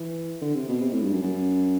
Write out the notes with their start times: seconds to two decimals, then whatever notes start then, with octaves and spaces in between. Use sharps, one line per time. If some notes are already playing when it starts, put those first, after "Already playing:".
Already playing: E3
0.41 D3
0.55 C3
0.69 B2
0.81 C3
0.92 A2
1.02 G2
1.12 F#2
1.22 F#2